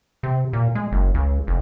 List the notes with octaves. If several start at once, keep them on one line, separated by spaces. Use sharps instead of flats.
C3
A#2
G#3
F#1
C#2
F1